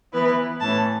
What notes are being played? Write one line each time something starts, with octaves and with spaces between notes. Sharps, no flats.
E3 B3 E4 B4
A2 E3 C#4 A5